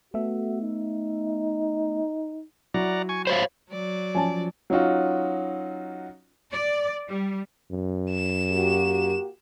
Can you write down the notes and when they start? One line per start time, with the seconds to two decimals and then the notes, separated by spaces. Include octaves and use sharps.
0.14 A3 B3 F#4 E5
0.62 D#4
2.74 F#3 E4 D5 F#5 A#5
3.09 G#5 C#6
3.27 C5 C#5 F5 B5
3.71 F#3 D5
4.15 F3 C#4 G#5 A5
4.70 F#3 C#4 D#4 F4 F#4
6.52 D5
7.08 G3
7.71 F#2
8.11 E7
8.52 A#3 F#4 G4